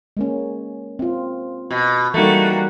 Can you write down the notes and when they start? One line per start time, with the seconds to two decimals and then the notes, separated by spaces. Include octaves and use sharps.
0.17 G#3 A#3 C#4
0.99 C4 F4
1.70 B2
2.14 E3 G3 A3 A#3 D#4 F#4